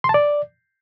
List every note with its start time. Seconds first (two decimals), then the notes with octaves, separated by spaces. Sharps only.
0.04 C6
0.09 A5
0.14 D5